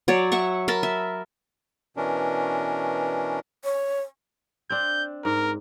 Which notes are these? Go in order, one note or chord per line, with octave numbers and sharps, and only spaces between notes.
F#3 C#5 D5
E5 F#5 C#6
A#4 A5 B5
E5
B2 E3 C#4 D4 A#4
C#5
C4 D4 G6
G#2 A#4